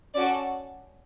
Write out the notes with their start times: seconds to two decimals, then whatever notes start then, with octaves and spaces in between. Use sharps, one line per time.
0.14 C#4 F#4 A4 D5